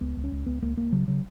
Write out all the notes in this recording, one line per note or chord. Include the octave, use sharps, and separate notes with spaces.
C#2 B3
C#2
C#4
C#2
C#2 B3
C#2 A#3
C#2 A#3
C#3 F#3
C#3 F#3